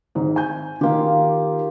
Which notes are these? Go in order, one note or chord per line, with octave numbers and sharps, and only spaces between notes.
G#1 G#2
G#5 G6
D#3 A#3 F4 G4